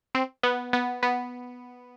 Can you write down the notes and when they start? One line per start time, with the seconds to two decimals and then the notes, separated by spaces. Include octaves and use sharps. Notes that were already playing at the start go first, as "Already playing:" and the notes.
0.15 C4
0.43 B3
0.73 B3
1.03 B3